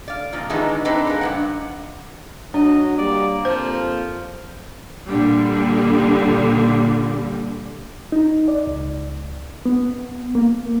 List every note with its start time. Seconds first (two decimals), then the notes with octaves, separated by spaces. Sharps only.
0.08 D5 F5
0.33 F2 A#2 F3
0.50 D#3 E3 G#3 B3 D4 D#4
0.85 C4 D4 D#4 G4 B4 C5
1.07 G#3 A#3
1.21 G2 D#3 F#5
2.54 F#3 D4 D#5
2.98 G3 A#3 D5
3.45 F2 F3 C5
5.08 A#2 D3 G3
8.12 D#4
8.48 D5
8.67 C#2
9.66 B3
10.35 A#3